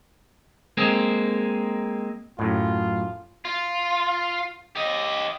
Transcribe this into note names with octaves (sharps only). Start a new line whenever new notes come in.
G#3 A#3 C4
F#2 A2 F4
F4
G4 D#5